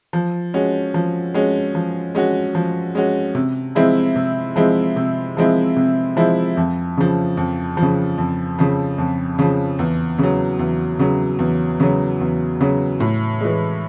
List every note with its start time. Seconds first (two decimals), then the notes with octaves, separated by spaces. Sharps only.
0.13 F3
0.54 G#3 C#4 F#4
0.94 F3
1.34 G#3 C#4 F#4
1.75 F3
2.15 G#3 C#4 F#4
2.55 F3
2.95 G#3 C#4 F#4
3.35 C3
3.75 F3 G#3 C4 E4
4.16 C3
4.56 F3 G#3 C4 E4
4.96 C3
5.37 F3 G#3 C4 E4
5.76 C3
6.17 F3 G#3 C4 E4
6.57 F2
6.97 C#3 F3
7.37 F2
7.77 F3
7.82 C#3
8.18 F2
8.59 C#3 F3
8.98 F2
9.39 C#3 F3
9.79 E2
10.18 C#3 F#3
10.59 E2
10.99 C#3 F#3
11.39 E2
11.80 C#3 F#3
12.20 E2
12.61 C#3 F#3
13.00 A2
13.41 E3 G#3